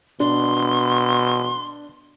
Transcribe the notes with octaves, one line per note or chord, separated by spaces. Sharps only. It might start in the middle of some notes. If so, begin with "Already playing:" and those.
B2 D4 C6